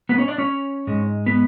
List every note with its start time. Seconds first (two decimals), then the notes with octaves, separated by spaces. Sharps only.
0.09 B3 B4
0.18 C#4 C#5
0.28 D4 D5
0.38 C#4 C#5
0.87 G#2 G#3
1.26 B3 B4